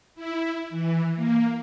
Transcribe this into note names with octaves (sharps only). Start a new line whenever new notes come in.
E4
E3
A#3